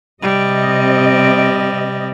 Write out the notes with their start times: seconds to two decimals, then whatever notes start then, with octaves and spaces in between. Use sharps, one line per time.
0.22 C3 G3 D#5